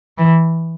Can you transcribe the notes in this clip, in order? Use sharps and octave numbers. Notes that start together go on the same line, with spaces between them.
E3